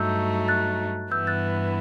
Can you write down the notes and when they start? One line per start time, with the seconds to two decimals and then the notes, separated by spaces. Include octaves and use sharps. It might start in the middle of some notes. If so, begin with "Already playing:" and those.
Already playing: G2 F#3 A3 D#4 E6 G6
0.48 F#6 A6
1.11 G2 E3 B3 E4 E6 G6
1.27 F#6 A6